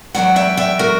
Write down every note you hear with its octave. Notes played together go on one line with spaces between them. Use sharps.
E2 C#3 F#3 B3 D5 F#5
E5 G5
E5 G5
F#4 A#4